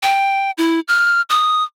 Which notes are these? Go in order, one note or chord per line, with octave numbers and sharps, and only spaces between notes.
G5
E4
F6
D#6